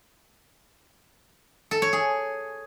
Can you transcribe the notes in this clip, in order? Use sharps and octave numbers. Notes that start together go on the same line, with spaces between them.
A4
C#5
G#4